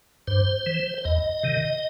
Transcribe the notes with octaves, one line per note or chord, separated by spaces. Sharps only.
G2 C5
E3
C5
E2 D#5
C3 D#3